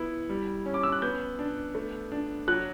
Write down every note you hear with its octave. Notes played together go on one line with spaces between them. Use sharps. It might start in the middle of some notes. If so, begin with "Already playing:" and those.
Already playing: B3 E4
G3
C#4
D6
E6
F#6
B3 G6
D4
A3
D4
F#3 F#6